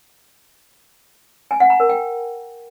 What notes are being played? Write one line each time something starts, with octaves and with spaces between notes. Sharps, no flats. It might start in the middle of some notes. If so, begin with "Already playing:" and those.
G#5
F#5
A#5
A#4
G5